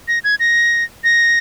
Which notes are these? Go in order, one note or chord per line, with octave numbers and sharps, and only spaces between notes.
A#6
G#6
A#6
A#6